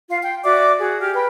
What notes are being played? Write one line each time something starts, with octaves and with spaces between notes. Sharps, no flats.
F4 F5
G5
F#4 D5 E5 D6
F#4 G#4
G4 F6
B4 G5